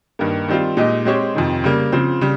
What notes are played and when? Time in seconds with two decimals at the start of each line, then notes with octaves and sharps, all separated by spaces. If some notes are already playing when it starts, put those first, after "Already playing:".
0.19 G2 D#3 A#3
0.48 D#3 G3 C4 F4
0.77 A#2 G#3 D#4 G4
1.05 G#3 C4 G4 C#5
1.35 F2 C3 D#3
1.64 C#3 G3 A#3
1.92 C#3 F3 C4
2.21 C#3 G3